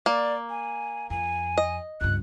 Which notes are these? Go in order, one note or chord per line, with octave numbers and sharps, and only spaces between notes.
A#3 D5
G#5
F2 G#5
D#5
C#2 G2 F#6